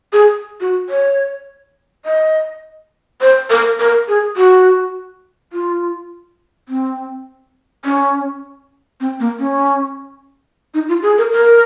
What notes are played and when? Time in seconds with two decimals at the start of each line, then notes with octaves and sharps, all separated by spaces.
0.13 G#4
0.61 F#4
0.90 C#5
2.05 D#5
3.21 C5
3.50 A#4
3.79 A#4
4.08 G#4
4.37 F#4
5.53 F4
6.69 C4
7.85 C#4
9.01 C4
9.20 A#3
9.39 C#4
10.74 D#4
10.88 F4
11.03 G#4
11.18 A#4
11.32 A#4